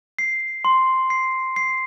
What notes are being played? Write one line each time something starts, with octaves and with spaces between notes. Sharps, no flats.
C7
C6
C7
C7